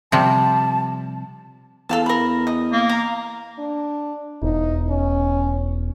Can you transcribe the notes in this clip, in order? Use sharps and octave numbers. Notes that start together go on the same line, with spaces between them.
C3 F3 G3 A5
E2 A4 F5 A5
A#4 B5
D#5
A#3
F5 A#5
D4
E1 D#4
C#4